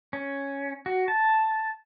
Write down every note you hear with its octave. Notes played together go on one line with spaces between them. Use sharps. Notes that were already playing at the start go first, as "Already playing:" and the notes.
C#4
F#4
A5